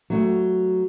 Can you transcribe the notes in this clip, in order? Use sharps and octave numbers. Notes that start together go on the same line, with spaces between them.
F#3 A3